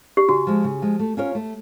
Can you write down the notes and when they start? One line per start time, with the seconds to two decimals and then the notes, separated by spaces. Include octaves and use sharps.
0.17 G4
0.28 C#3 F#4
0.47 F3 G#3
0.64 C#3
0.82 F3 G#3
0.99 A3
1.17 C#4 F4 A#4 C#5
1.35 A3